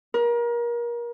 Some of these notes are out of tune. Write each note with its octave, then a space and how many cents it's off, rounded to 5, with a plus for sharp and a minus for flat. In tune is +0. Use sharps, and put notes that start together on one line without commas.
A#4 +30